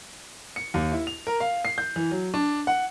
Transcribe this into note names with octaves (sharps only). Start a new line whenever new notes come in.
C#7
D#2
E4
F7
A#4
F5
C7
G6
E3
F#3
D4
F#5